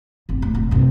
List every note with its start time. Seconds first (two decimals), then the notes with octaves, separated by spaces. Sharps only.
0.29 G1 C4
0.42 A2
0.55 F1
0.71 G2 C3